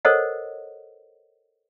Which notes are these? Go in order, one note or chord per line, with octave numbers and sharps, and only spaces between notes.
A4 A#4 C5 C#5 D#5 F#5